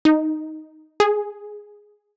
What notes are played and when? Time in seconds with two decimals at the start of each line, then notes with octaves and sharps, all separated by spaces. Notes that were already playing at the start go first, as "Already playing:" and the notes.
0.05 D#4
1.00 G#4